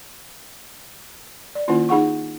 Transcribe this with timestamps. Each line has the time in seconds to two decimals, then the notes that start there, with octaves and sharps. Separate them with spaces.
1.55 D5
1.68 D#3 A#3 C#4 E4 F4
1.89 D#4 G#4 F#5 C#6